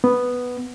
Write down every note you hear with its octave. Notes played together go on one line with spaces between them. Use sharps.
B3